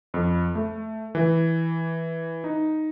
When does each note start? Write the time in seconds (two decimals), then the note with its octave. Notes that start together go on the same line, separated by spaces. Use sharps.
0.14 F2
0.55 A3
1.15 E3
2.44 D#4